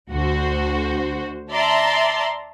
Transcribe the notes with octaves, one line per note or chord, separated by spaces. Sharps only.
D2 F#4 C5
D5 E5 A5 A#5 C6